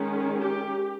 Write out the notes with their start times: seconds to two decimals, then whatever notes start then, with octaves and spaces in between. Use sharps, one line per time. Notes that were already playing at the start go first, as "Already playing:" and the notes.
Already playing: D#3 G#3 C#4
0.40 G4